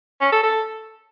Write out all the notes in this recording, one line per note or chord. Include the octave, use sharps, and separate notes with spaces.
C#4
A4
A4